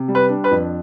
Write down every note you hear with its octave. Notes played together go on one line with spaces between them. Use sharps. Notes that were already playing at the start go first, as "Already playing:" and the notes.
Already playing: C3
G3
B4
D4
B4
F2